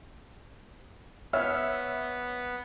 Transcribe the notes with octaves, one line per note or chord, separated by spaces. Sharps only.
B3 C#5 E5 F6